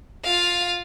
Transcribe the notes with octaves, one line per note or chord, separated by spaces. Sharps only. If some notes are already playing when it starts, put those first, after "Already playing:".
F4 F5